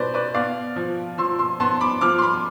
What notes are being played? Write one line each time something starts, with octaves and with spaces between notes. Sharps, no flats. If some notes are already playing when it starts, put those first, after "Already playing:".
Already playing: B2 B4 C5 D5
B4 D5
B3 D5 F5
F3
F3 C6 E6
C6 E6
B3 A5 C6
B5 D6
F3 D6 F6
C6
B5 D6